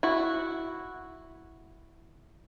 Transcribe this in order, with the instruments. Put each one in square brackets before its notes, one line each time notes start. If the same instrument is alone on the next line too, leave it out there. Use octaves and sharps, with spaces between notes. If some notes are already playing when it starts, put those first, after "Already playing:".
[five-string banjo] E4 F#4